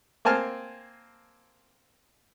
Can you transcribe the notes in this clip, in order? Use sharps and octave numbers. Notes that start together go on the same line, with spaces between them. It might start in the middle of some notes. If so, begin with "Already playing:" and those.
A#3 C4 G#5 A5 F6